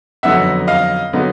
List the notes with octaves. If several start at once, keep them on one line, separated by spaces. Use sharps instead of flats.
F2 D3 F#3 B3 D#4 E5 F#5
D#5 F5
D3 F#3 B3 D#4